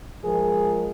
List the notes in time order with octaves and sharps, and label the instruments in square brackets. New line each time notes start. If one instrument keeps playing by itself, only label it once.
[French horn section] F3 G#3 A#4 [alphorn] G#4